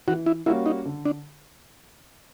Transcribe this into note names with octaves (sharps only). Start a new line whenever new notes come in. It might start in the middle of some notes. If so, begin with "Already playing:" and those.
E3 F#4
E4
G3 A#3 C#4 E4 F#4
D#4
D3
D4